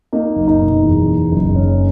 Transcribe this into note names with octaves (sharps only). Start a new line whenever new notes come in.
A#3 D#4
F#1
D#4
B2
E2
A#3
F#1
C#4